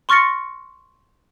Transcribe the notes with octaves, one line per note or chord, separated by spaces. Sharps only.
C6 C#6 F6 A6 A#6 C#7